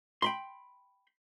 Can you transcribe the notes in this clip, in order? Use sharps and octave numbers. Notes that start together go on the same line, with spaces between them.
G5 B5 C6